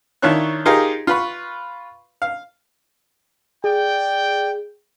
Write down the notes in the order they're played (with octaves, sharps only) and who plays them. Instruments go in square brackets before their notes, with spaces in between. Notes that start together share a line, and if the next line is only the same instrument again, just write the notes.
[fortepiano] D#3 D4 E4 F4 C#5 F#6
D#4 F4 G4 G#4 A#4
F4 B4 B5 C#6
F5
[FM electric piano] G#4 [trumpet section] D5 G5